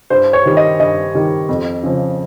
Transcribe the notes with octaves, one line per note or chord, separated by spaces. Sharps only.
G2 C5
C#5
D#3 G3
D#5
G2 D#5
D#3 G3
F2
C#3 F3